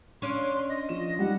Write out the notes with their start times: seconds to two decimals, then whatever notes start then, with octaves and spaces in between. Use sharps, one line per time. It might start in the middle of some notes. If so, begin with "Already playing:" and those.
0.22 C#4 D4 F5 C6
0.69 D#5
0.89 F3 E7
1.19 G3 D#4 F#5